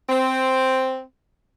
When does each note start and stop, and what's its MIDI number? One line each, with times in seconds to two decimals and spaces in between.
0.09 1.01 60